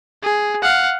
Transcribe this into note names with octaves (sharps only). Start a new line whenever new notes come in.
G#4
F5 F#5